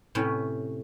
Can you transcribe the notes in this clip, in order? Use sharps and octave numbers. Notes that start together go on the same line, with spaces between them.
A2 C3 C#4 B4